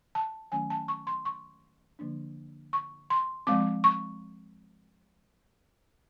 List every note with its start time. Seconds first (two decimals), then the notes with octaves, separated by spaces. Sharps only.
0.15 A5
0.52 D#3 F#3 A3 C#4 G#5
0.70 A5
0.88 C#6
1.07 C6
1.25 C#6
1.99 D3 F3 A#3 D4
2.73 C#6
3.10 C6
3.47 F3 G#3 C4 D6
3.84 C#6